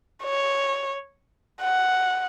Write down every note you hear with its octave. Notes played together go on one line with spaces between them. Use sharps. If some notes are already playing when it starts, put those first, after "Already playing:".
C#5
F#5